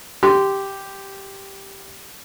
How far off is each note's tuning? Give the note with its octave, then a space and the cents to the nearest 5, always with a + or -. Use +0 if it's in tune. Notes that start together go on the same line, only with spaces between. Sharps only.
G4 +0 C6 -15